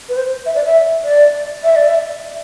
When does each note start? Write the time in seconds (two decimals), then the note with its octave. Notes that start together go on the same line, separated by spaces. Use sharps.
0.09 B4
0.17 C5
0.46 E5
0.55 D5
0.66 E5
1.04 D5
1.64 E5
1.76 D5
1.87 E5